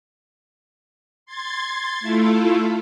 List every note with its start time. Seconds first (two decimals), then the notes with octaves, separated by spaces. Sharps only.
1.26 C6 G#6 A6
2.00 A3 E4 F4 A4